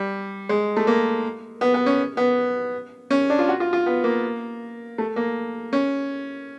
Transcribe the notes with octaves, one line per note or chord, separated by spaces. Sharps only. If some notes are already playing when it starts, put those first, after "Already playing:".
Already playing: G3
G#3
A3
A#3
B3
B3
C#4
B3
C#4
D4
F4
F#4
F4
F4
B3
A#3
A3
A#3
C#4